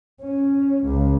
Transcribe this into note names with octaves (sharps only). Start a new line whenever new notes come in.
C#4
C#2